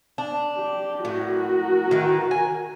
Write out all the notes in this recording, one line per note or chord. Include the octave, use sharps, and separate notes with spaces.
D4
G4
A2 F#4 A#4
D#3 E3
G#5